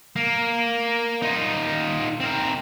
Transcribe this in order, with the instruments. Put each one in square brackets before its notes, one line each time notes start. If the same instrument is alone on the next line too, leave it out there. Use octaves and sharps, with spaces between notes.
[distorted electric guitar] A#3
D#4 F4
C4 A#4